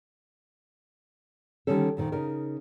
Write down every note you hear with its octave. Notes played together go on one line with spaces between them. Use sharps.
D3 D#3 F3 G3 C#4 A4
D2 A#2 D#3
C#3 D#4 A#4